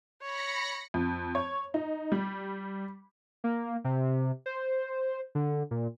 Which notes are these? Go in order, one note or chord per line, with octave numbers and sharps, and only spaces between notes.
C#5 B5 A#6 C#7
F2
C#5
D#4
G3
A#3
C3
C5
D3
A#2